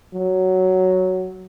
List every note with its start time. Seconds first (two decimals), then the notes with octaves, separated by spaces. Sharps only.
0.14 F#3